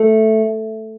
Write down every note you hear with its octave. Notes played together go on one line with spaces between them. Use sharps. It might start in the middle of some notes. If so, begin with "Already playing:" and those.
Already playing: A3